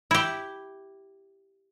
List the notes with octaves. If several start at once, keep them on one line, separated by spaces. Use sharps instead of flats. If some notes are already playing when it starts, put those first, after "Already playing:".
E4 G4